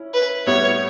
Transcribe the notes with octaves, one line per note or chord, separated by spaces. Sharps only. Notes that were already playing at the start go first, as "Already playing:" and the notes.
Already playing: C#4 E4
B4
A2 G3 B3 E4 C#5